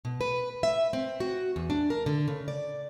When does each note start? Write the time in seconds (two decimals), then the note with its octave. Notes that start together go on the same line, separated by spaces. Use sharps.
0.05 B2
0.21 B4
0.63 E5
0.93 C4
1.20 F#4
1.56 E2
1.70 D4
1.90 A#4
2.06 D3
2.28 C#3
2.48 D5